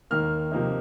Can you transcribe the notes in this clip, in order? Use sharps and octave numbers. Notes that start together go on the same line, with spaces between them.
D#2 D#3 A#3 F6
C3 F3 A#3 D#4